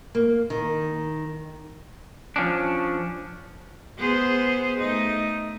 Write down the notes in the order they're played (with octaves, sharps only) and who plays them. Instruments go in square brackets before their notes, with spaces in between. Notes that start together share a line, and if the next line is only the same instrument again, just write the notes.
[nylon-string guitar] A#3
D#3
[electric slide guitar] F3 C#4 D4
[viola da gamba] B3 G#4 C5
A3 D#4